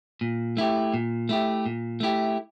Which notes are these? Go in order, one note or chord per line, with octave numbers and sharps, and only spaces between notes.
A#2
A3 E4 G4
A#2
A3 E4 G4
A#2
A3 E4 G4